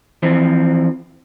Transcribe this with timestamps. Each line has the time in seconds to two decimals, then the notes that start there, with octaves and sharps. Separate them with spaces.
0.23 E3 F3 C4